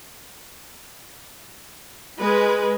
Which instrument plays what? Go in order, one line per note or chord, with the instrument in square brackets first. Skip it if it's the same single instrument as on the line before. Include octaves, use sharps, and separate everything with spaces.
[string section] G#3 B4